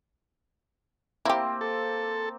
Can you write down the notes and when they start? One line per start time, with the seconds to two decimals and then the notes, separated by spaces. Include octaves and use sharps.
1.25 A#3 C4 E4 G4
1.61 A4